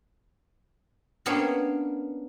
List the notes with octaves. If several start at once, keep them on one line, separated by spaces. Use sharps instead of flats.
A#3 B3 C#4 D4 C#5